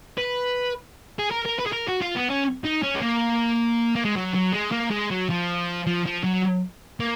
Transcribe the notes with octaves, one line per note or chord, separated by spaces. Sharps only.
B4
G#4
A#4
A#4
B4
G#4
A#4
F#4
F4
B3
C#4
D#4
C#4
G#3
A#3
A#3
G#3
F#3
F#3
G#3
A#3
G#3
F#3
F3
F3
F3
F#3
A#3